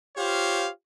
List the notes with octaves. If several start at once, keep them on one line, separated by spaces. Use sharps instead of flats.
F4 G4 C5 C#5 F5